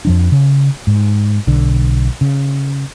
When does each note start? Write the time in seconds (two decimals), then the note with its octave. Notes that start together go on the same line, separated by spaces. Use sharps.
0.05 F2 F3 D4
0.32 C#3
0.87 G#2
1.47 B1 D3
2.21 C#3